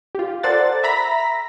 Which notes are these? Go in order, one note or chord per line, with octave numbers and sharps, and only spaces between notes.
F4 G4
A4 A#4 C5 D5 F#5 A6
E5 A#5 B5 A#6 B6